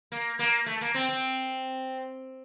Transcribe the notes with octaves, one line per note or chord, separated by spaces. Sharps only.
A#3
A#3
A3
A#3
C4
C4